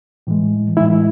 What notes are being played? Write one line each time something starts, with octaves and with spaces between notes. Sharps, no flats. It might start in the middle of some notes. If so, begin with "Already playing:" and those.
A2 E3 G#3
A2 E3 G#3 E4